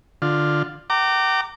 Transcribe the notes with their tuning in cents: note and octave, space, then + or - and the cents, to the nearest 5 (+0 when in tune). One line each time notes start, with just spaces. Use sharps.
D3 +10 F4 +0
G5 -40 A#5 -25 D6 +0